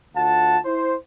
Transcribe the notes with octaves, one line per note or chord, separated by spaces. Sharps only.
D2 F4 F#5 A5
E4 C5